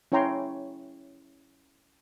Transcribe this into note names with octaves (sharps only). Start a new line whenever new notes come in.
C#4 E4 C#5 G5 A#5 C6